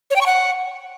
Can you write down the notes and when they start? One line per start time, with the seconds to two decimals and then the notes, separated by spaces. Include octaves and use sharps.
0.10 C#5
0.16 G5
0.21 C#6
0.26 F#5